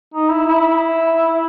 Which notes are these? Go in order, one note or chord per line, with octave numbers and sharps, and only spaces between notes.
D#4
E4
E4